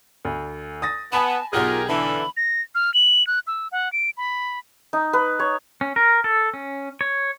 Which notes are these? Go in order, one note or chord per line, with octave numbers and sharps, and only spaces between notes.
D2
D#6 A6 A#6
B3 G#5 A5 B5
B1 F4 G4 G#4 A#4 F#5 F6
D3 E3 A4 B5
A#6
F6
F#7
F#6
E6
F#5
D7
B5
D#4
B4
C#5
C#4
A#4
A4
C#4
C#5